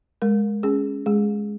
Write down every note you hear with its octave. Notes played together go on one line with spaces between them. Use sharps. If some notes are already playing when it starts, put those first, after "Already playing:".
G#3 A#4
C#4 G#4
G#3 G#4